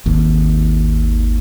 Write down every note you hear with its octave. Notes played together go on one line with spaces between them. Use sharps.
G#1 D#2